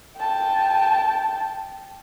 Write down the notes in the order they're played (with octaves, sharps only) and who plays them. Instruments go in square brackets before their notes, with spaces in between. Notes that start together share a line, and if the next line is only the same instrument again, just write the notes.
[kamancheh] G5 A5